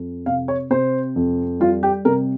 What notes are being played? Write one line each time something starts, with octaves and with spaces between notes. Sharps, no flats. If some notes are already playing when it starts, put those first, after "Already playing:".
Already playing: F2
C3 F5
C#5
C3 C5
F2
G3 F4
G4
C3 A#4